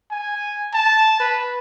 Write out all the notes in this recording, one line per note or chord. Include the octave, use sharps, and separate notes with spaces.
G#5
A5
B4